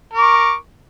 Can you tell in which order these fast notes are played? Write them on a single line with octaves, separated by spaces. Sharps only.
A#4 D6 C#6